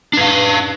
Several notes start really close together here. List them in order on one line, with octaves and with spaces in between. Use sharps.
D4 B4 F5